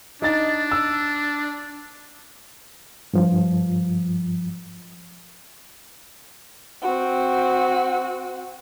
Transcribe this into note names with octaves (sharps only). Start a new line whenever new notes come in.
D4 D#4 A6
E6
G2 F3
C4 F#4